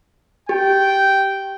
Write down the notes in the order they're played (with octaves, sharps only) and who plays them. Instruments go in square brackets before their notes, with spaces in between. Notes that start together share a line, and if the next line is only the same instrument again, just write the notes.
[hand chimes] G4 [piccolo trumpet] G5